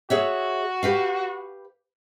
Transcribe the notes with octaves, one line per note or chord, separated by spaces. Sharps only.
F#4 G#4 C#5 E5
G4 B4 F5